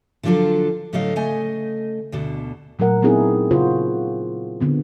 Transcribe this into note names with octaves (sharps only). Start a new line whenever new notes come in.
D3 F3 F#3 D4 F4 A4
A2 D3 F#3 A4 D#5 F5
C#3 A3 D#5 G#5
D2 B2 D3
A#2 F#3 A3 A#4 F#5
B3 C4 D#4 E4 G#4
C#3 F4 F#4 C5
D3 B3 C4